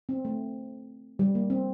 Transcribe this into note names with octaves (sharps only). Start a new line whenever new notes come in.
C4
A3
G3
A#3
C4